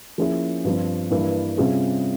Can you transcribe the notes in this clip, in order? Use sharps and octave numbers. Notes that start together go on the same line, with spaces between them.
F3 A#3 C#4 E4 G#4
G2 F3 C4
G2 E3 A#3 E4
C3 G3 C#4 F4 G#4